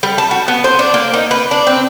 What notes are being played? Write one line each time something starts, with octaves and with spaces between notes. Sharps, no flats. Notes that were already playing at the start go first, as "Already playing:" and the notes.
G3
A5
F#4
B3
C5
D4
A#3
D#4
B4
D4
C4